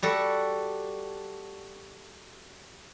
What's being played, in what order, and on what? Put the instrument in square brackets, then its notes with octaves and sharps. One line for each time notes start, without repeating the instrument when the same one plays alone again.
[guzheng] G3 F#4 A4